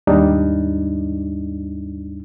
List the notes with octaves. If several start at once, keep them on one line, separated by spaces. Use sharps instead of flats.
D#2 G#2 G3 D4 D#4